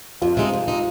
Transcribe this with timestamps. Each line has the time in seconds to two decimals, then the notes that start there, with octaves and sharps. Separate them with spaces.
0.22 F2 F4
0.37 C3 G#3 D#4
0.53 F2
0.68 C3 G#3 D#4